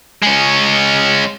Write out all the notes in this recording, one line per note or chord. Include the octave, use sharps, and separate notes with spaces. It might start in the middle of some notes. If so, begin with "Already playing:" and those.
G#3 C#4